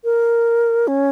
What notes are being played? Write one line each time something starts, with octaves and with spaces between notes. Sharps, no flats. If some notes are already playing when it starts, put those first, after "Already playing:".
A#4
C#4